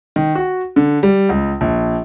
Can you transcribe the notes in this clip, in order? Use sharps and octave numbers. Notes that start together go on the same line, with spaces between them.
D#3
F#4
D3
G3
C#2
A#1